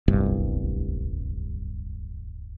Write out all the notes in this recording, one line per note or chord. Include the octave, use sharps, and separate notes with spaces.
D1 G1 C2 G2